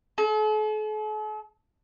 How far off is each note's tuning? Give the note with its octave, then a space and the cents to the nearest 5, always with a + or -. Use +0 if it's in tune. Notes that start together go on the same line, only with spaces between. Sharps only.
A4 -45